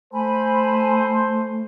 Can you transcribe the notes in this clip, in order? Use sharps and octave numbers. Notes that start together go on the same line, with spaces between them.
A3 A4 C5 G#5 B5